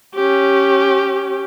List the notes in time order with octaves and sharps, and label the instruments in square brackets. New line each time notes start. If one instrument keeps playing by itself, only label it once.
[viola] C#4 G4